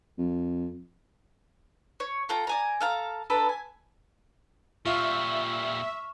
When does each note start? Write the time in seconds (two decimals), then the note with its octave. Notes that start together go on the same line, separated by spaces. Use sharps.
0.19 F2
2.00 C#5
2.29 F4 A4 G5 A#5
2.47 D5 G#5 A#5
2.81 A4 F5 A#5
3.30 D4 A4 B4 A#5
3.49 G#5
4.85 A#2 G3 F4 E5 C#6 F6 F7